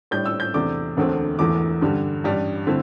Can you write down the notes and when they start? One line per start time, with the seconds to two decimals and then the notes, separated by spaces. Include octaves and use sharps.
0.11 A2 G3 D4 G6
0.25 E6
0.40 G6
0.54 E2 C3 A3 D4 D6
0.97 E1 D2 D3 A3 C4
1.39 E1 E2 E3 A3 D6
1.81 G2 D3 G3
2.24 A1 G2 G3 D4
2.67 D3 A3 C4 E4